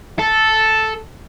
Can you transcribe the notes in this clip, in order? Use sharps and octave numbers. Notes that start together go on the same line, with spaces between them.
A4